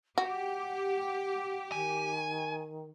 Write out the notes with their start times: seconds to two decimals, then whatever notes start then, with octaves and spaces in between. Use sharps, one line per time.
0.18 F#4 G4 F#5
1.72 D#3 G#5